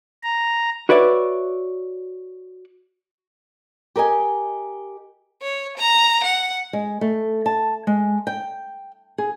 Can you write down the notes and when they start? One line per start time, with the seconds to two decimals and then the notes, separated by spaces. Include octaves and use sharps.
0.23 A#5
0.89 F#4 B4 C#5 D5 E5
3.96 G4 A#4 D#5 G#5
5.42 C#5
5.77 A#5
6.23 F#5
6.73 G#3
7.01 A3
7.46 A5
7.87 G#3
8.27 G5
9.18 G#4